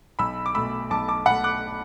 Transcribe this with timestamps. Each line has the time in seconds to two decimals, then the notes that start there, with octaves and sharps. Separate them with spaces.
0.19 B1 B5 E6
0.46 D6
0.55 B2 A3 B5 E6
0.90 B1 A5 D6
1.08 A5 D6
1.26 B2 A3 F#5 B5
1.44 D6 F#6